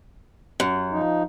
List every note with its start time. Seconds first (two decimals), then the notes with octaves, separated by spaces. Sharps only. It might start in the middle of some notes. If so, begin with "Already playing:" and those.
0.60 F#2
0.92 F3 D#4